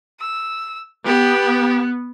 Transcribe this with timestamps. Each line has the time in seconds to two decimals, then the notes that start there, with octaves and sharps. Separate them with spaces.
0.20 E6
1.06 B3 G4